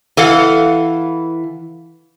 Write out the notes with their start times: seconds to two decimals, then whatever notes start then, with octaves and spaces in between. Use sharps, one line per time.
0.17 E3 A4 F5 F#5